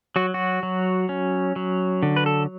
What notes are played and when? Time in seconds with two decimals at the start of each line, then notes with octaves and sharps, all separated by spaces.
0.16 F#3 F#4
0.34 F#4
0.63 F#3
1.09 C#4
1.56 F#3
2.03 D3
2.16 B4
2.26 A4